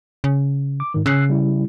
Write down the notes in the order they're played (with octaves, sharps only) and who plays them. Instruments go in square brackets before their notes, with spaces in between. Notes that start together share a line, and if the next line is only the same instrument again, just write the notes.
[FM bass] C#3
[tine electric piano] D6
G#2 D#3
[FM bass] C#3 [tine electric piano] E6 F#6 C7
[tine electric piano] G3 E4